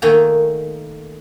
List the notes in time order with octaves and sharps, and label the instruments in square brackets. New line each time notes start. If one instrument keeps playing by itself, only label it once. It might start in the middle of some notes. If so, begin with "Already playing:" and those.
[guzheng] D#3 A3 A#3 F#4 G#5 A#5